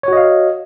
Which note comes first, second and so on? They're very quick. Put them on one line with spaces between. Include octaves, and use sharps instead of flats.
C#5 F#4 D#5 F5